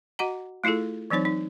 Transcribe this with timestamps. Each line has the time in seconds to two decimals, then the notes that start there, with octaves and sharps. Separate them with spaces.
0.19 F#4 D#5 F#5 A#5
0.64 A3 E4 F4 G#4 A4
1.10 E3 F#3 C4 D#4 C#5
1.25 D#4